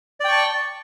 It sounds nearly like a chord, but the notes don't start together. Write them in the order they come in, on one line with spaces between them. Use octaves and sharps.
D5 G5 C#6 A5